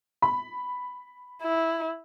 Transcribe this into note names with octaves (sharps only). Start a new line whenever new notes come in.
B5
E4